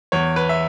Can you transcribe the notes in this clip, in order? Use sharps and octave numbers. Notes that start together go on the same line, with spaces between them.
E2 C#5
B4
E5